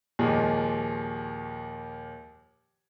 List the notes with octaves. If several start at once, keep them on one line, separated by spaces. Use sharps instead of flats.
D#2 A#2 D#3 F3 G#3